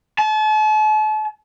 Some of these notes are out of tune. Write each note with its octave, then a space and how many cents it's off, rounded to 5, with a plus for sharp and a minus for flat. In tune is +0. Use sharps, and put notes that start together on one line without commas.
A5 -40